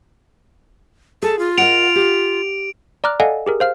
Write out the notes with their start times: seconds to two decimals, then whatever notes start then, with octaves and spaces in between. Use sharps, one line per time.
1.22 G#4 A4
1.39 F4
1.58 A#4 D#5 F#5 D7 F7
1.96 G4
3.04 D5 A#5 D6 F6 F#6
3.20 A4 D5 D#5 F5 F#5 G#5
3.46 G4 G#4 A#4
3.60 C5 F5 F6